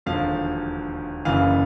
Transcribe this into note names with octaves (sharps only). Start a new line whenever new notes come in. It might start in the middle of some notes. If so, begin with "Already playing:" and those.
E1 D#2 D3 F3 F5
F#1 F#2 C#3 E3 F5